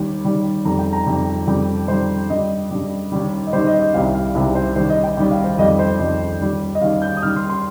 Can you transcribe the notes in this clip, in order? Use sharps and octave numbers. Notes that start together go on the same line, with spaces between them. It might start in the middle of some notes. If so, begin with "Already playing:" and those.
Already playing: D#2 D#3 G3
D#2 D#3 G3
F2 D#3 G3 A#5
G5
A#5
F2 D#3 G3
F2 D#3 G3 G5
F2 D#3 G3 C5
G2 G3 D#5
G2 G3
D#2 D#3 G3
D#5
D#2 D#3 G3 C5
D#5
D#5
C2 C3 D#3 G3 F5
F5
C2 C3 D#3 G3
C5
D#2 D#3 G3 C5
D#5
G5
D#2 D#3 G3 G5
F5
C5
F2 D#3 G3 D#5
C5
F2 D#3 G3 D#5
D#2 D#3 G3
D#5
D#2 D#3 G3 F5
G6
D#6
D#2 D#3 G3 F6
C6
C6